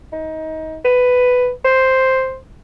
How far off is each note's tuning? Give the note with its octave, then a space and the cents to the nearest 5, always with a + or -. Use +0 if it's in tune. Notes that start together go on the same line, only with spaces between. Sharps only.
D#4 +25
B4 +10
C5 +0